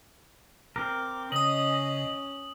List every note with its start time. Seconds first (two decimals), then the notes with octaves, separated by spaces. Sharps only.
0.76 C4 A#4 D6
1.32 C#3 C#4 D#5 D#6 F#7